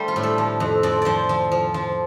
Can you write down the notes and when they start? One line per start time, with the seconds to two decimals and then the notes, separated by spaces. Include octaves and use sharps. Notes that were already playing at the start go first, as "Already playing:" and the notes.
Already playing: G3 A3 D4 G4 C5
0.08 F4
0.16 A2
0.23 A4
0.38 F3
0.60 F2
0.83 F2 D5
1.02 F3 C5 D5
1.29 F3
1.52 F3
1.74 F3